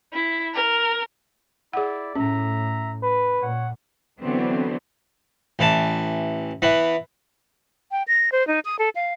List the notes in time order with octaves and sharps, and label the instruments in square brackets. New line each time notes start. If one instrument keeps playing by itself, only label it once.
[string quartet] E4
A#4
[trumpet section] E4 D5 [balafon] G#4 F#5
[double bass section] A2 [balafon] C#4 [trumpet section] E5 A#5
[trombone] B4
[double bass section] A#2 [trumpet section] C#5 F#5
[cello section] D3 E3 F#3 B3 C4
[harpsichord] A1 E3 A5
E3 B3
[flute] G5
A#6
C5
D#4
D#6
A4
F5